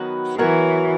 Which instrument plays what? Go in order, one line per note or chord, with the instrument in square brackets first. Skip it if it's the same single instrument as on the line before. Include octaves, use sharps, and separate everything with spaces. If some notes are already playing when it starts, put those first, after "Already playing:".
Already playing: [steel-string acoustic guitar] D#3 F#3 B3 F#4 B4
[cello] E3 [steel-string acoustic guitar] F#3 B3 F#4 A#4 C#5